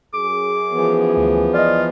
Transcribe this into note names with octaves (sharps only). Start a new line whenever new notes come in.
F#2 G#4 D6
E3 F3 B3
D2
F4 D5 D#5